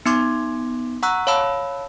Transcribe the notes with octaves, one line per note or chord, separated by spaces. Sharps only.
B3 D#4 C6 D6 G#6
F#5 A#5 C#6 E6 F#6
C#5 F5 A5 B5 E6